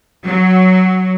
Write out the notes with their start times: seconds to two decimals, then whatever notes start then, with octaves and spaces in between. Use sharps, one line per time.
0.24 F#3